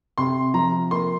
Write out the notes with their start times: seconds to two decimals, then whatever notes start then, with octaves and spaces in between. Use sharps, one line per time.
0.18 C3 C6
0.54 F3 A#5
0.91 A#3 C6